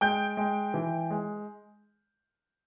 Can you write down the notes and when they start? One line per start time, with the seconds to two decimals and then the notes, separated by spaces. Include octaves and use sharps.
0.01 G#3 G5 G6
0.37 G#3
0.74 E3
1.11 G#3